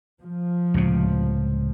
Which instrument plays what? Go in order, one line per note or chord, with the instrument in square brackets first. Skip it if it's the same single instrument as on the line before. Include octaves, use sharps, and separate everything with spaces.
[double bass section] F3
[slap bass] C#2 A2 C3